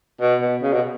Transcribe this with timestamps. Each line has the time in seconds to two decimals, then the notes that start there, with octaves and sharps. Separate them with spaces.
0.21 B2
0.41 B2
0.62 C#3
0.73 B2